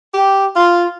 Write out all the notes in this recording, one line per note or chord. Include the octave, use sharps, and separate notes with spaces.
G4
F4